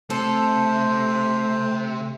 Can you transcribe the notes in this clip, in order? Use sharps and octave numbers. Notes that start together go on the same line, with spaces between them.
C3 A3 A4 C5